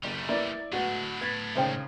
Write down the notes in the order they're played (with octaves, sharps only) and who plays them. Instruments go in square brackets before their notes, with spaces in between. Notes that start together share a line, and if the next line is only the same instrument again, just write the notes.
[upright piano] F#1 [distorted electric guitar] G3 A3
[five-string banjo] A#3 B3 [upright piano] E4 D5
[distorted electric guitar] A2 D4 [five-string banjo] G#3 A3 B3 [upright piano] F#4
[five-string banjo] B3 [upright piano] G#6 A6 B6
[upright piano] G#1 C#3 [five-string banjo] D#4 C5 G5